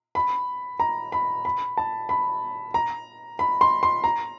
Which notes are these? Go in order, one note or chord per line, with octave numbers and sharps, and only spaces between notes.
B5
A#5
B5
B5
A5
B5
A#5
B5
C6
C6
A#5